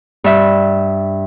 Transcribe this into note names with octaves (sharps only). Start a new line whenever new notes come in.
G2 E5